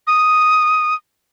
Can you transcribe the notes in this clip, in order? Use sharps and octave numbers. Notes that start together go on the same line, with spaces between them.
D#6